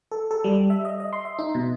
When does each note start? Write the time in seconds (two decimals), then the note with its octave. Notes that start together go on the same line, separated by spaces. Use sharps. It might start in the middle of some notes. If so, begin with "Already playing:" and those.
0.11 A4
0.31 A4
0.44 G3
0.70 E5
0.85 D#5
1.00 D#5
1.13 C6
1.25 E5
1.39 D#4
1.55 B2